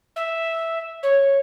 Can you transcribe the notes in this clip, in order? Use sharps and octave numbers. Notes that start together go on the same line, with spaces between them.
E5
C#5